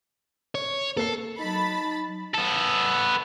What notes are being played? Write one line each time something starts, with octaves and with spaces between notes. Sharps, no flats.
C#5
A#3 A4 C7
F#3 D#4 A5 B5 A6
B3 A4